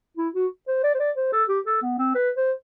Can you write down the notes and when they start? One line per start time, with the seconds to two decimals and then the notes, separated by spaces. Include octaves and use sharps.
0.17 E4
0.34 F#4
0.67 C5
0.83 D5
0.94 C5
0.99 D5
1.16 C5
1.32 A4
1.48 G4
1.66 A4
1.82 B3
1.98 C4
2.15 B4
2.37 C5